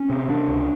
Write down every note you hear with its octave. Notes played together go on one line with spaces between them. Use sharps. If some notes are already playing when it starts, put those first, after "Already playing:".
Already playing: C#4
C3
C3 D4
C#2